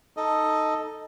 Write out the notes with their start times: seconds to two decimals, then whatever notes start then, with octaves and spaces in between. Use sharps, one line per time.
0.17 D#4 A4 D#5